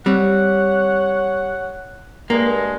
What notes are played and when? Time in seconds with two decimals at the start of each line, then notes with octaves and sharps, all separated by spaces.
0.06 G3 C4 C#5 F#5
2.30 G2 G#3 A#3